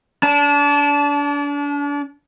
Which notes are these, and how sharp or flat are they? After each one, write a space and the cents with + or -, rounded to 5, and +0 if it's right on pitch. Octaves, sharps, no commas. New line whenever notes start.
D4 -35 A5 -15